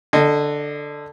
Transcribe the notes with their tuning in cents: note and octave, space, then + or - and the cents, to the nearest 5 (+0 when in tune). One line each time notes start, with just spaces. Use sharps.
D3 +5 D#5 -20